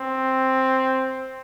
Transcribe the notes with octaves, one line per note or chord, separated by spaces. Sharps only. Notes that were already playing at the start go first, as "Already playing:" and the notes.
Already playing: C4